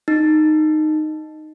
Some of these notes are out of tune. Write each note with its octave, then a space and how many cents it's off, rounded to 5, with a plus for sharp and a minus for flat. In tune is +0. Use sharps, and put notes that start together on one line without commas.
D#4 -10